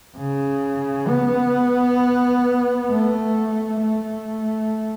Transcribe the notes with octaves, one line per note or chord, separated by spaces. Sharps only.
C#3
B3
A3
A3